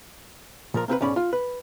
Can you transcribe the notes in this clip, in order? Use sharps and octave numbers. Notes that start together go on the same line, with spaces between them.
A#2 F3 A#4
A#3 C4 G4 B4
B1 G#2 C#4 D5 B5
F4
B4